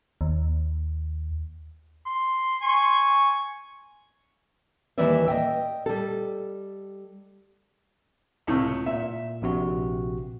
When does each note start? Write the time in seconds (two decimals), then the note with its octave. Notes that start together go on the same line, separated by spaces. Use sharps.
0.21 D#2
2.06 C6
2.62 G#5 C#6
4.98 D#2 E3 G3 B4 D5 E5
5.28 D#5 E5 G5
5.86 G3 A4
8.47 C#2 A2 C3
8.86 A#2 E5
9.42 A#1 C3 F#4